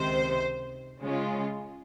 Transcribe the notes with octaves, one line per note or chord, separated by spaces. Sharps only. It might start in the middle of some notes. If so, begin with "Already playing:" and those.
Already playing: C#2 C3 D#3 C5
C#3 G#3 C#4 F4